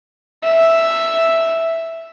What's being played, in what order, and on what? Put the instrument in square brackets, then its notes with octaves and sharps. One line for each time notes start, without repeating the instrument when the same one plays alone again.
[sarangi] E5